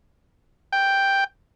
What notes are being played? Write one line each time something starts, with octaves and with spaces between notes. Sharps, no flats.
G5